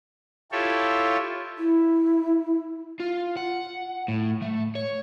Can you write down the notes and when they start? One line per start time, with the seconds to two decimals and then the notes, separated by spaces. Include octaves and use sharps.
0.52 E4 F4 G4 A4 C#5
1.58 E4
3.00 F4
3.37 F#5
4.08 A2
4.42 A3
4.75 C#5